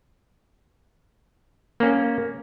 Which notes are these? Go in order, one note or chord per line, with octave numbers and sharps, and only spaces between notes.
A#3 C#4